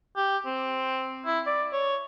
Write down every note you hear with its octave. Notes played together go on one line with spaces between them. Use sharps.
G4
C4
E4
D5
C#5